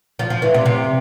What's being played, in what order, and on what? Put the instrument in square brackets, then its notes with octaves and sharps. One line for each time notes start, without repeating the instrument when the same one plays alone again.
[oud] F3
F3
E3
C3
C3